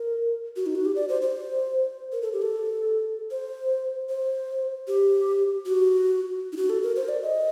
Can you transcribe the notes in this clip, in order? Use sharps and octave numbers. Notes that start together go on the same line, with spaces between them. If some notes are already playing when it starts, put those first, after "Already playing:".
Already playing: A#4
F#4
D#4
F#4
G4
D5
C5
C5
A#4
A4
G4
A4
C5
C5
G4
F#4
D#4
F#4
A4
A#4
C5
D5
D#5